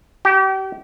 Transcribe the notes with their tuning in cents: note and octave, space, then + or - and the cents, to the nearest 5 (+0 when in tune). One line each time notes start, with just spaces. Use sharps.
G4 -35